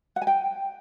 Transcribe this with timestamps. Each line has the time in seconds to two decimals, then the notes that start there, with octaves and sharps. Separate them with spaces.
0.16 F#5
0.22 G#5
0.27 G5